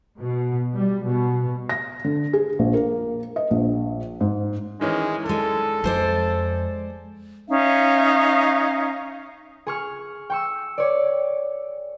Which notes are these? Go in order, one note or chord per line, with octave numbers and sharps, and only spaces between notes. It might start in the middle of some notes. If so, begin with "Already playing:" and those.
B2
G3
B2
A#6
D3
G#4
A#1
A#3
D#5
A#1
G#2
D#3 E3 G#3 C#4
G#3 D4 A4
F2 G#3 C5 D5
C#4 D#4 E5 F5
G#4 C#6 F6
G5 C#6 E6
C#5 D5